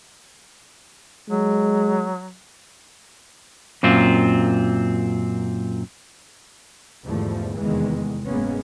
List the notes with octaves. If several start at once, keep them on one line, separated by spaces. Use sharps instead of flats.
F#3 G#3
F#2 A#2 C4 F4
E2 G#2 D3 F3 G3 A3
F1 E2 D#3 E3 G#3 B3
F#1 G#2 G#3 A#3 B3 C#4